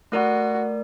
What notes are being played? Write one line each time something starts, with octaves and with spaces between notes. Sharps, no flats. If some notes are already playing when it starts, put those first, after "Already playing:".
A3 F#4 A#4 D5